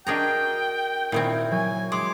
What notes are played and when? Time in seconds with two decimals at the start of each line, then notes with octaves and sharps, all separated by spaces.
0.07 D4 F#4 G#4 A#4 D#5 G5 A#5
1.12 A#2 D#3 C4 E4 G#6
1.51 F#3 G#5
1.92 G#3 C6 D6